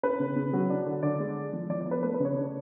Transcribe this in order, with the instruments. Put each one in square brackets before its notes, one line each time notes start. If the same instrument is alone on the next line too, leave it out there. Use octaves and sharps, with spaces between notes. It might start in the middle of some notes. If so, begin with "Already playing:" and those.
[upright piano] C#4 B4
C#3
C#3
F#3
D4
D3
D3 D5
G#3
D4
F3
F3 D5
D5
B3
B4
A3 B4
B4
C#3
C#5
D4